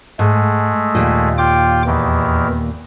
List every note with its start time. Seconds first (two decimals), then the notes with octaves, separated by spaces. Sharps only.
0.19 G#2 G#3 A3
0.95 D#2 A#2
1.38 F4 G5 D6
1.87 E2 D#3 E3